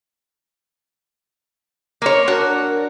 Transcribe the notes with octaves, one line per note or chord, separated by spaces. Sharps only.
A#3 C#5
D4 F#4 A#4